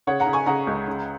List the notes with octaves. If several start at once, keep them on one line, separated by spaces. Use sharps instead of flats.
C#3 C#5 F#5
F#5 A#5
C#3
G#5 C#6
C#3 F#5 A#5
C#2
C#3